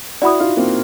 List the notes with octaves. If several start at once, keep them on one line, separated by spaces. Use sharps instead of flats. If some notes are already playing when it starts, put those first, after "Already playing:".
E4 F#4 D5 F#5 B5 D#6
D#4 F4
A#3 C4